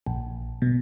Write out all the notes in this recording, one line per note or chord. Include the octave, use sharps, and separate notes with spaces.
A#1
B2